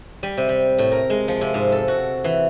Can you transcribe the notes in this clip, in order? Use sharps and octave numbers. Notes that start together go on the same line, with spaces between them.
G3
C3
G3
A2
A#4
G#3
F3
C3
G#2
A4
F#4
E3